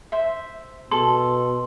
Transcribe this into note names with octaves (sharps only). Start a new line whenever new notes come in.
C5 E5
B2 A4 C6